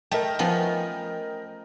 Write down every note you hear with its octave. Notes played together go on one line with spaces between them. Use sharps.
A3 A#4 D#5 G5
F3 B3 C#4